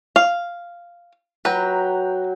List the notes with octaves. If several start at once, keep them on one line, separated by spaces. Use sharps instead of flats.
F5
F#3 B4 G5 A#5